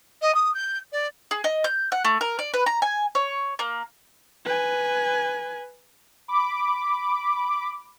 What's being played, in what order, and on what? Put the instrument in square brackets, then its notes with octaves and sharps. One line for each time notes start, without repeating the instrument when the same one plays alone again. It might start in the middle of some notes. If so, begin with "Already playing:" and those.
[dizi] D#5
D#6
G6
D5
[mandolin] G#4
D#5
G6
F#5
A3
A#4
D5
B4
A#5
G#5
C#5
A#3
[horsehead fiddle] B4 G#5
[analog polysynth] B5 D6